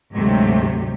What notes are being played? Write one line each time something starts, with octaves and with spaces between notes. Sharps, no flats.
D2 G#2 C3 F#3 A3 G4